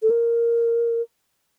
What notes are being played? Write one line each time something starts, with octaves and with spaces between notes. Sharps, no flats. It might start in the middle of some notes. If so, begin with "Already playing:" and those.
A4
A#4